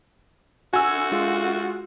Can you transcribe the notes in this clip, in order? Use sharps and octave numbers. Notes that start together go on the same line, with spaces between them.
F#4 G#5 E6
G#3 F4